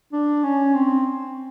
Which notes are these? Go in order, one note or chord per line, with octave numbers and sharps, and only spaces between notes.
D4
C#4
C4